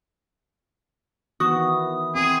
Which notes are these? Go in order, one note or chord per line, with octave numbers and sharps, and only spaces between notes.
D#3 E3 B3 F#4 D#6
C4 G#4